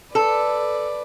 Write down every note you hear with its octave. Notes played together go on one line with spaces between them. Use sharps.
A4 B4 D5